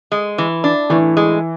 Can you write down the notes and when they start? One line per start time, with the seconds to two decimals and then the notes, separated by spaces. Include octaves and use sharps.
0.12 G#3
0.38 E3
0.64 D4
0.90 A2 E3
1.17 G#3